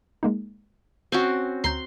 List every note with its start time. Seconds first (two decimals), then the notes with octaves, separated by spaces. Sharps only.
0.23 G#3 A#3 D#4
1.12 C4 C#4 F#4
1.64 D2 A#5 C6 G6